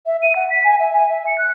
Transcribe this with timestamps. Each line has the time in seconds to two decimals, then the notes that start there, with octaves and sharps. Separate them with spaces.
0.06 E5
0.22 D#7
0.36 F#5
0.50 B6
0.64 G#5
0.80 E5
0.94 G#5
1.09 E5
1.27 C#7
1.38 F#6